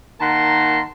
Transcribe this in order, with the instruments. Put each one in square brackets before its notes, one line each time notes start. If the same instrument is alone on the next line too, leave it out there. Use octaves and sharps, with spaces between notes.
[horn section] D#3 A#3 F#5 A5 A#5 C6